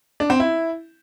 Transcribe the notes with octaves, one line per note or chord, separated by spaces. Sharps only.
D4
C4
E4